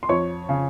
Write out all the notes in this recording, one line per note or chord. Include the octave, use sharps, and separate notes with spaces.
C6
F2 C#5 C#6
C#3